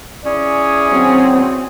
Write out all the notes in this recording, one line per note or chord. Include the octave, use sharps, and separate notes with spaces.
C#4 E4 G#4 D5
F#3 C4